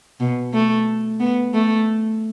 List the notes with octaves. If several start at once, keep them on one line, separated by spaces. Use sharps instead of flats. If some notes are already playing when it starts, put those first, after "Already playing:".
B2
A3
B3
A3